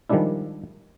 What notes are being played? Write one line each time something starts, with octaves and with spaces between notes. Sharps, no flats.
D#3 F3 G3 G#3 D4 E4